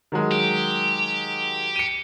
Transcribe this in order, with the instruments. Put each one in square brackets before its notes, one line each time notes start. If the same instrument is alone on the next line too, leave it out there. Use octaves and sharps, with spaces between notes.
[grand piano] D#3 F#3 G#3
[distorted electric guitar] G4
[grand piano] C#7 D#7